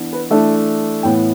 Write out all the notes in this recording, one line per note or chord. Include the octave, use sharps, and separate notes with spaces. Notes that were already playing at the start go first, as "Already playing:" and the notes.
Already playing: E3 B3 D4
B4
E3 A3 D4 E5
A2 E3 B3 G5